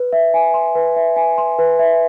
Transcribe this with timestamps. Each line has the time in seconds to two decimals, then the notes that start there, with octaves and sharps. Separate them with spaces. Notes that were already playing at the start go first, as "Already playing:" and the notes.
Already playing: B4
0.12 E5
0.34 G#5
0.54 C6
0.75 B4
0.96 E5
1.16 G#5
1.38 C6
1.59 B4
1.79 E5